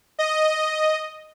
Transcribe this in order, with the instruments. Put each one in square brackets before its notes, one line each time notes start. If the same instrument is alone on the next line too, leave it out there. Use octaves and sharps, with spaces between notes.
[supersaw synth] D#5